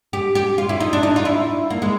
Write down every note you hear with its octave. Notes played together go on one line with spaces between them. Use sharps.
G4
G4
F4
E4
D#4
D4
D#4
F4
E4
A#3
G#3